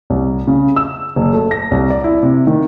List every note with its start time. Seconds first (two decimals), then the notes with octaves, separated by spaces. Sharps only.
0.10 C2
0.47 C#3
0.76 E6
1.16 F#1
1.33 A3
1.51 A#6
1.71 C2
1.90 D5
2.04 E4
2.23 C3
2.47 D#3